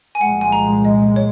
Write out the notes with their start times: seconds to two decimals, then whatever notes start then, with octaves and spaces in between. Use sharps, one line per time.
0.15 G#5
0.20 C2 A#2 F3 G#3 F#5
0.41 G#5
0.52 A#5
0.85 D#5
1.16 C#5